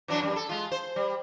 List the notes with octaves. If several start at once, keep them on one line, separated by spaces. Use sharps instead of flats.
E3 F#3 D4
F#2 G3
A4
G#3 F4
C5
G3